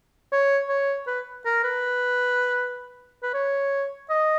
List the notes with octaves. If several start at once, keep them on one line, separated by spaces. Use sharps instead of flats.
C#5
C#5
B4
A#4
B4
B4
C#5
D#5